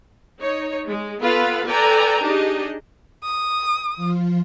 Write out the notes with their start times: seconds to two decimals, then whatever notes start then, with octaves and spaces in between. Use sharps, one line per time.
0.40 D#4 C#5
0.88 G#3
1.24 B3 F4 A4 B4 F5 B5
1.67 A4 B4 D5 G5 G#5 A#5
2.23 D4 D#4 G4 G#4 D#5
3.24 D#6
3.96 F3 F4